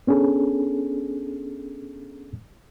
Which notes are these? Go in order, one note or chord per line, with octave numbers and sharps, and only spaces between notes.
B3 C#4 D4 G#4 A4